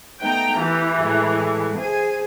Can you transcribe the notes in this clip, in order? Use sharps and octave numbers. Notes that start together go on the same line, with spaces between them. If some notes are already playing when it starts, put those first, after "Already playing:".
A3 B3 D#4 G5 A#5
E3 G4
A2 G#3 A3
G#4 C5 G#5